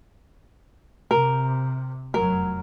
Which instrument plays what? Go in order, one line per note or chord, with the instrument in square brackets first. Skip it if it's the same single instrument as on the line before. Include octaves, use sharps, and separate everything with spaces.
[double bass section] C3 [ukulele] A#4
[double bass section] F1 F#2 F#3 [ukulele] A#4